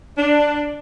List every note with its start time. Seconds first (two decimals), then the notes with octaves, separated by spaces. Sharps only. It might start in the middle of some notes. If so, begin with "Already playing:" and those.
0.18 D4